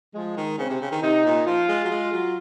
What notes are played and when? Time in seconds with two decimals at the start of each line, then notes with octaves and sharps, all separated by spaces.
0.15 F3 G#3
0.37 D#3
0.58 C#3 C4
0.69 C3
0.81 C#3
0.92 D#3
1.02 C3 D#4
1.24 A#2
1.46 F3 F4
1.68 G#3
1.84 F#3
1.90 G#3
2.12 F#3